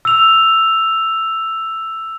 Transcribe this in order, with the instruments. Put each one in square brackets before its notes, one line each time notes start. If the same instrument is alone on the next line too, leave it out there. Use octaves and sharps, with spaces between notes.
[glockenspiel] E6 F7